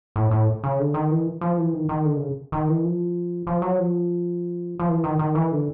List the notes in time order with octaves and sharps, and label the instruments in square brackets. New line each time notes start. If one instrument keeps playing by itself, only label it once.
[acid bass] A2
A2
C#3
D3
D#3
E3
F3
E3
D#3
D#3
D3
C#3
D#3
E3
F3
F3
F#3
F3
F3
E3
D#3
D#3
E3
D3